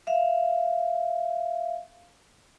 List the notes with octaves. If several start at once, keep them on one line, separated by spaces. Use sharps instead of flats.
E5 F5